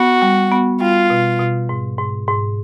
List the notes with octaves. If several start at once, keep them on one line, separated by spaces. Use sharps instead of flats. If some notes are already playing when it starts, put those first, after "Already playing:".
Already playing: B3 F#4
G3
B3
G3 F4
B2
B2
G#2
G#2
G#2